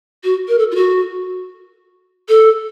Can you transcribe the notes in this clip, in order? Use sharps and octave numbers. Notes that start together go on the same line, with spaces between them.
F#4
A#4
A4
F4
F#4
A4